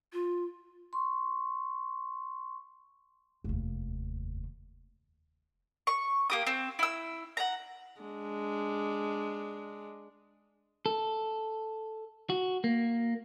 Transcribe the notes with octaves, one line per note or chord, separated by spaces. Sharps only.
F4
C6 C#6
F1 D#2
C#6
A#3 G4 D#6
C4
E4 E6
F#5 A#5
G#3 D4
A4
F#4
A#3